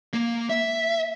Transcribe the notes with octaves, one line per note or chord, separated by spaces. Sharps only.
A#3
E5